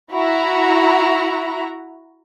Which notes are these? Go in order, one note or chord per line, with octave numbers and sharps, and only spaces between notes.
E4 F#4 A#5